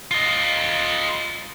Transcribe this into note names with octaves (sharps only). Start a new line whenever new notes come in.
F4 D#5